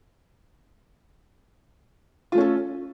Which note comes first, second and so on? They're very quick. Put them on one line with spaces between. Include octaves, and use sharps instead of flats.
F4 A3 C#4 A4